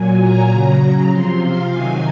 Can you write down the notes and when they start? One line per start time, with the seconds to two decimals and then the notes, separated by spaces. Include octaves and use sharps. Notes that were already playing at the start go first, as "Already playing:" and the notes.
Already playing: A#2 F#3 G#5
0.21 A#5
0.51 C#3 F#3
1.11 C3 F3 C6
1.42 F5
1.71 C3 D#3 F#3 G#5